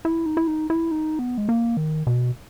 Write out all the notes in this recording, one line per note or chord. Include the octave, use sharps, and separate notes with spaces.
E4
D#4
E4
D#4
E4
D#4
B3
G#3
A#3
D#3
B2